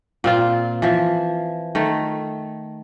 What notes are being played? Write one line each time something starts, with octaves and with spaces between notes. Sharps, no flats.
A#2 C4 F4
E3 F3
D#3 A3